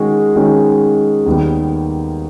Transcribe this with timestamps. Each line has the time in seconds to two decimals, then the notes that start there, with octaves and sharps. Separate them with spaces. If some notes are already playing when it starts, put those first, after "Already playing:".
Already playing: D#3 G#3 C#4 F#4
0.36 D#3 G#3 C#4 F#4
1.26 D#2 D#3 G3 B3